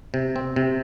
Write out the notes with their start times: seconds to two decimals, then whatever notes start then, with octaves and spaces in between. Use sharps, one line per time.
0.14 C3
0.36 C4
0.56 C3